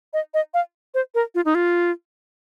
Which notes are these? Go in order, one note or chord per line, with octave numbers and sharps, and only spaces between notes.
D#5
D#5
F5
C5
A#4
F4
D#4
F4